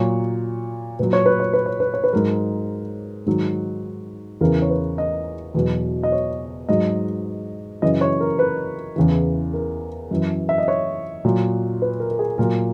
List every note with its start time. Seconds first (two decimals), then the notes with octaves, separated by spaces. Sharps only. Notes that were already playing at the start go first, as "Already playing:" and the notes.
Already playing: A#2 F#3 C#5
0.99 A#2 F#3 B4
1.13 C#5
1.26 B4
1.40 C#5
1.53 B4
1.66 C#5
1.80 B4
1.94 C#5
2.04 B4
2.13 G#2 F#3 A#4
3.26 G#2 D#3 F#3
4.41 E2 C#3 E3 A#4
4.62 C#5
4.70 B4
4.98 D#5
5.54 E2 B2 F#3
6.03 D#5
6.12 C#5
6.69 G#2 F#3 D#5
7.82 F#2 C#3 E3 D#5
8.01 C#5
8.21 A#4
8.39 B4
8.96 E2 C#3 E3
9.53 A#4
10.11 F#2 E3
10.49 E5
10.58 D#5
10.68 C#5
11.25 A#2 F#3
11.82 B4
12.00 A#4
12.11 A#4
12.19 G#4
12.38 A#2 F#3 A#4